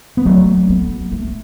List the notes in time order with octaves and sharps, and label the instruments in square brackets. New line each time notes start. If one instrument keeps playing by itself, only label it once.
[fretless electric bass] B3
[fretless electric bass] F#3 A3 [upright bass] C#4
[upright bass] B3
A3